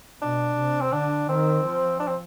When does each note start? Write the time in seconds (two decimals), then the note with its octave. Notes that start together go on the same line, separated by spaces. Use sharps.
0.21 B2 D4
0.57 C3
0.81 C4
0.93 D3 D4
1.28 D#3 C4
1.64 F3
2.00 D4
2.08 C4